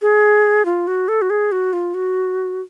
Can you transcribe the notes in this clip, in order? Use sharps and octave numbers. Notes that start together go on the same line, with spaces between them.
G#4
F4
F#4
A4
F#4
G#4
F#4
F4
F#4